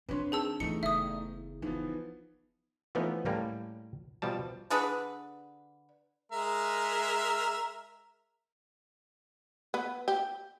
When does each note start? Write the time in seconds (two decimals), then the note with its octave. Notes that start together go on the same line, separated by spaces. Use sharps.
0.09 C4 D4 B4 C#5 C6
0.32 D#3 G#4 A5 E6
0.60 E3 A3 B3 D#4 G#4 C#7
0.83 F#1 E5 D#6
1.62 E3 F3 B3 D#4
2.95 E3 F3 A3 B3 C#4 D#4
3.25 A2 G3 A#3 C#4
4.22 B2 F3 G3 A5
4.70 D3 D4 G#4 B4
6.32 G#3 A#4 E5
9.74 B3
10.08 G4